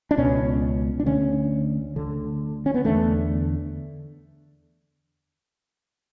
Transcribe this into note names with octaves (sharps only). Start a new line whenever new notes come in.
D4
C#2 B2 C#4
D4
D2 D3 C#4
D2 D3
C#4
B3
E2 D3 A3